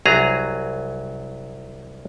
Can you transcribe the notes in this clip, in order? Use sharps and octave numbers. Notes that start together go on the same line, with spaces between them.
C2 F#3 G#4 A#5